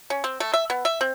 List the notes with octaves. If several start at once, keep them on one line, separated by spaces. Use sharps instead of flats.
C#4
C4
A3
E5
B3
E5
C4